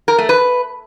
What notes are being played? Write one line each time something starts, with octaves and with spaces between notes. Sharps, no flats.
A#4
A3
B4